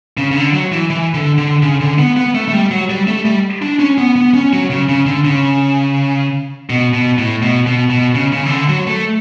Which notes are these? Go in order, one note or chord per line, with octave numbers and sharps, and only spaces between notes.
C#3
C#3
D3
F#3
E3
E3
D3
D3
C#3
D3
B3
B3
A3
A3
G3
F#3
G3
A3
G3
D4
C#4
B3
B3
C#4
F#3
C#3
C#3
D3
C#3
B2
B2
A2
B2
B2
B2
C#3
C#3
E3
D3
F#3
A3